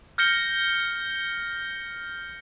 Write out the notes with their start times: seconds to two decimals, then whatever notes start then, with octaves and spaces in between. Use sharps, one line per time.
0.18 F6 G6 A#6 C#7 G7